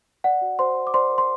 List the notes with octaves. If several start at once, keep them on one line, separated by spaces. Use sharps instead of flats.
D5 F#5
F#4
F#4 C5 C6
D5
D6
C5 D5 C6
A#4
C6